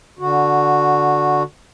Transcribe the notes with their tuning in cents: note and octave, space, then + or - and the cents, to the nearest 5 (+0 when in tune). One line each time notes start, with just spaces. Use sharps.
D3 -5 F#4 -5